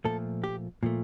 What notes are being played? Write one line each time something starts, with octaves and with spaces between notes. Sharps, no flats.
A#2 F3 A3 A4
G4
A#2 F3 A3